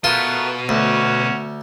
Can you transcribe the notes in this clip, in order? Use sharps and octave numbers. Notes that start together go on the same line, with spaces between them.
B2 A3 B3 F4 A#4
D2 C#4 F#4